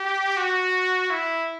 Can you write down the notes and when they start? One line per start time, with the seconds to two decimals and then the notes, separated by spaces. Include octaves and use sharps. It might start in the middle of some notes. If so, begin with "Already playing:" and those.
Already playing: G4
0.37 F#4
1.10 E4